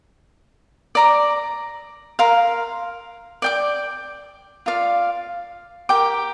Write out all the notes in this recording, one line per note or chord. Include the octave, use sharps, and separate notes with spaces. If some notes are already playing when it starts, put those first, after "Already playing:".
D5 A#5 D6
A#4 F5 C6
D5 G5 D6
F4 D5 F5
G4 A#4 G5 D6